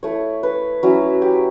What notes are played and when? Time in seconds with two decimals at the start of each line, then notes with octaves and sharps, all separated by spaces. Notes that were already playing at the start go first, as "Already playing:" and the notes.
0.03 A3 E4 C#5
0.43 B4
0.83 F#3 C#4 E4
1.22 G4